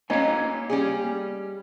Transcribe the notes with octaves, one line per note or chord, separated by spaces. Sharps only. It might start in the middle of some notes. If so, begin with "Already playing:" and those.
A#3 C#4 D#4 C#5 G#5
G3 C#4 G#4